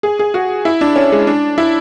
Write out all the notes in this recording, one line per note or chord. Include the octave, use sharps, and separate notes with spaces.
G#4
G#4
F#4
E4
D4
C#4
G#3
D4
E4